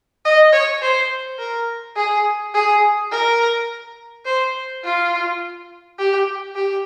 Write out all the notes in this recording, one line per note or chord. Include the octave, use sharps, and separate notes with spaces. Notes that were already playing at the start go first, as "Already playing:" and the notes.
D#5
C#5
C5
A#4
G#4
G#4
A#4
C5
F4
G4
G4